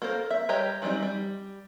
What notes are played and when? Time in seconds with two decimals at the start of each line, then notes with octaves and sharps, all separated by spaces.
0.02 A#3 A4 A#4 C5
0.31 E5
0.49 G3 G4 C#5 D#5 A#5
0.82 E3 F#3 G3 C4 D#4
1.03 G3